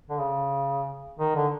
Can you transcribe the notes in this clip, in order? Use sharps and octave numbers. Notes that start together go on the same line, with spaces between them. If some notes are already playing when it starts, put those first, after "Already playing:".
D3
C#3
D#3
D3